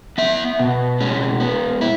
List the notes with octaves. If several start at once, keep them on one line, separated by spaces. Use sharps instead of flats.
B3 E5
B2
G#3 C#4
B3
E4